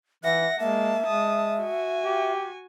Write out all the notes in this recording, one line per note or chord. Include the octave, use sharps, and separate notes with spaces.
E3 E5 F#5 A#6
G#3 A#3 E5 A5
G#3 A5 D#6
F#4 G#5
G4